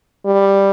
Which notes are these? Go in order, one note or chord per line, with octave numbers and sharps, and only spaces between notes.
G3